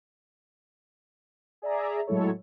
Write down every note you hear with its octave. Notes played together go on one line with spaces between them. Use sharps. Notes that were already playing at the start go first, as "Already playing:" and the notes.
G#4 D5 E5 A#5
A2 F#3 G#3 E4 A4 C#5